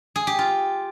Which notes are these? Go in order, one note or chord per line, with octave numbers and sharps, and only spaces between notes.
G#4
G4
F4